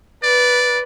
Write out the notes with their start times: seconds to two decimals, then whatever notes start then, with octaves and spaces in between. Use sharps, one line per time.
0.24 B4 D5